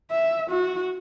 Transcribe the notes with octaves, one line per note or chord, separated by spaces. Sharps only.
E5
F#4